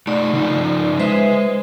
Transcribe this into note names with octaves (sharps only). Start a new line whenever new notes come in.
A3 D#4 D5
C#3 F3 D#4
G#3 B4 C5 E5